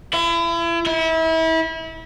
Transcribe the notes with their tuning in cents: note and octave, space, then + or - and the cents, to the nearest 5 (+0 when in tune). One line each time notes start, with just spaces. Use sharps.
E4 +35
E4 -30